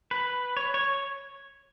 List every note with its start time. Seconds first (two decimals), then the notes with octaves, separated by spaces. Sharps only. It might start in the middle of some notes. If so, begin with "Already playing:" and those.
0.11 B4
0.57 C#5
0.74 C#5